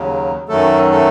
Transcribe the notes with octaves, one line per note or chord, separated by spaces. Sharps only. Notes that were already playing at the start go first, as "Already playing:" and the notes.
Already playing: D#2 C#3 F#3
F#2 D#3 F#3 A3 A4
A3 A4